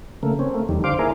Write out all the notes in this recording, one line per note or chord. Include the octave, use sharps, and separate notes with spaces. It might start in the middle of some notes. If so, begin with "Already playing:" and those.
C#3 A3 A#3
C4 C#4
A3 A#3
E2 D#3 G3
D3 C5 F5 D6
A#3 E4 G#4 A#4